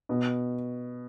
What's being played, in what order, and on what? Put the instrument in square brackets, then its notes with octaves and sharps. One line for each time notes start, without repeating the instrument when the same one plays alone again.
[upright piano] B2